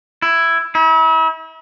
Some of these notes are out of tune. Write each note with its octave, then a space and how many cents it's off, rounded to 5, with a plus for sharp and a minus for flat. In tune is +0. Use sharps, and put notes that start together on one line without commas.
E4 +10
E4 -40